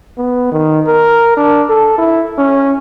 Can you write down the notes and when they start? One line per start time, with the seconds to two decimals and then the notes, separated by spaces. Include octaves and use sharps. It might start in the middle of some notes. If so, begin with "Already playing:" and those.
0.17 B3
0.52 D#3
0.87 A#4
1.37 D4
1.69 A4
1.98 E4
2.38 C#4